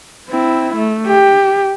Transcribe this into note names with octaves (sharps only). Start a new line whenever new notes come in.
C4 E4
A3
G4